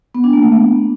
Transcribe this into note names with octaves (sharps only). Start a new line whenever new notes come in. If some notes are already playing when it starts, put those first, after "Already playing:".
B3
D4
A#3
A3
B3